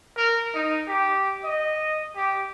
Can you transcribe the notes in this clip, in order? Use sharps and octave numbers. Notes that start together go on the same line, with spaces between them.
A#4
D#4
G4
D#5
G4